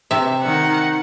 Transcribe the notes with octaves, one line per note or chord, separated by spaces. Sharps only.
C3 E5
D#3 F#5